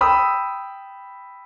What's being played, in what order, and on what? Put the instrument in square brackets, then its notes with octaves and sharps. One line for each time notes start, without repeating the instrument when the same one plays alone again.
[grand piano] G5 B5 D#6 E6